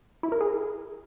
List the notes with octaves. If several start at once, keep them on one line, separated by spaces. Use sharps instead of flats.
E4
A#4
G#4